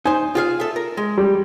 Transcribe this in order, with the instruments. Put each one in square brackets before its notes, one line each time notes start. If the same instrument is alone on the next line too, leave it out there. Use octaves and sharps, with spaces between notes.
[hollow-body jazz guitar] D#4 C5 [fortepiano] G#5
[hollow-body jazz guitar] F4 G#4 F5
A4 E5
A#4
G#3
[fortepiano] G3